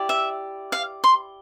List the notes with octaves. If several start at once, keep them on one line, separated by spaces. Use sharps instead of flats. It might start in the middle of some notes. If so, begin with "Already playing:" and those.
Already playing: E4 G4 D5
E5
F5
C6